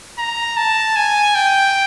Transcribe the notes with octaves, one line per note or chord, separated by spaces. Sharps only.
A#5
A5
G#5
G5